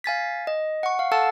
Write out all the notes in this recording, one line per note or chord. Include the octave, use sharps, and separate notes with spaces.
F5 G#5 A6 B6
D#5
F#5 C#6
F5
A4 F5 F#5 A5 E6 A6